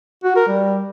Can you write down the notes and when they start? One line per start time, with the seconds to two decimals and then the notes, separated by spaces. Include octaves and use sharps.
0.24 F#4
0.36 A#4
0.48 G3